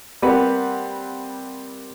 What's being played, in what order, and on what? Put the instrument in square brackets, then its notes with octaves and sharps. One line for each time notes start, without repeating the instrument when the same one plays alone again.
[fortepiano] G3 A#3 C4 G4 B4 F#5